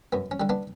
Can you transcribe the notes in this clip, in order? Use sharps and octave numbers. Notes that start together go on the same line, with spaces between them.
F#2 B3
C#4
D3 G3
B3 D4